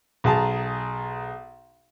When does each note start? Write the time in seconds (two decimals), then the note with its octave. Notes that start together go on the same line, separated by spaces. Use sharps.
0.24 B1 G#4 A5 A#5